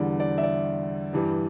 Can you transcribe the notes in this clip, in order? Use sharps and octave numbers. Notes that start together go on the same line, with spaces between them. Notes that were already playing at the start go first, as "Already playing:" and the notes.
Already playing: E2 D3 G3 D5
D5
E5
D5
G2 E3 G3